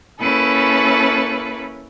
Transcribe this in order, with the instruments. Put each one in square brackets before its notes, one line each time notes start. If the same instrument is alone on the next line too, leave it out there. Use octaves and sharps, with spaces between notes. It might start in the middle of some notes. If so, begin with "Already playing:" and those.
[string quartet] A#3 C#4 E4 A4 B4